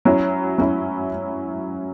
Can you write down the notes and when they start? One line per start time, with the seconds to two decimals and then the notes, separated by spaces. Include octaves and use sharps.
0.05 F#3 C#4 E4
0.58 F#3 C#4 E4